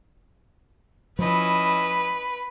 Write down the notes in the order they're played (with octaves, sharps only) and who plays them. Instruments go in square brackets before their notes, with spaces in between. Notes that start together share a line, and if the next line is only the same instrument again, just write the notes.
[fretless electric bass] F3 [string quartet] C#4 E4 D#5 [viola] B4